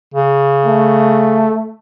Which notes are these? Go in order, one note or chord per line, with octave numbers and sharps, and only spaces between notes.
C#3
A3